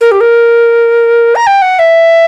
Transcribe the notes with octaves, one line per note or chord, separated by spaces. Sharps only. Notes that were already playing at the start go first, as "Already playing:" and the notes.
A#4
G4
A#4
A#5
G5
F#5
E5